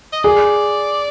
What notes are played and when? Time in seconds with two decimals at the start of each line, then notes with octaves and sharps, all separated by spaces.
0.13 D#5
0.24 G#4 D5